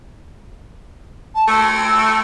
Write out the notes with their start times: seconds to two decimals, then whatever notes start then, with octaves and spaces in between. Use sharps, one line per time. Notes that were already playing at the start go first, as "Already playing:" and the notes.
1.34 A5
1.48 A3 E6